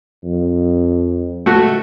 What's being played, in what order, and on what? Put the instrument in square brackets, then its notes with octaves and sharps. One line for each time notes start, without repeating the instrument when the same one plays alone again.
[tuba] F2
[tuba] C#2 [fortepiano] A3 F#4